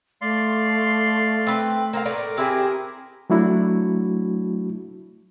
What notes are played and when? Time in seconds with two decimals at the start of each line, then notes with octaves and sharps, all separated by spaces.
0.21 A3 D5 F5 C6
1.47 C4 B4
1.93 A#3 C4 A#4 F5
2.06 A2 B4 D5
2.37 C4 E4 G4 G#4
3.30 F#3 A3 D4 E4 F#4